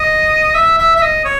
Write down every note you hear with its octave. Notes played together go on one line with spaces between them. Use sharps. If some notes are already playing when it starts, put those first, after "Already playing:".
Already playing: D#5
E5
E5
E5
D#5
C#5